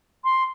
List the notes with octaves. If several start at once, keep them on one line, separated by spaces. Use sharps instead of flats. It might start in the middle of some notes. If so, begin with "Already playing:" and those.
C6